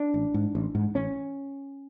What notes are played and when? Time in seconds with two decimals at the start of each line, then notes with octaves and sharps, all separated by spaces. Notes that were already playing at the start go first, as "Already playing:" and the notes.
Already playing: D4
0.14 A1
0.34 G#2
0.55 A1
0.75 G#2
0.95 A1 C#4